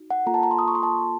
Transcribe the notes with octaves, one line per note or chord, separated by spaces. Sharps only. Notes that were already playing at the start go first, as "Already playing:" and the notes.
Already playing: D#4 F#4
F#5
A#3 F4 A4 A#5
A5
A#5
C6
D#6
C#6
C6
A5